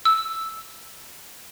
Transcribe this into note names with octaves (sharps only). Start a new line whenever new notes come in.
E6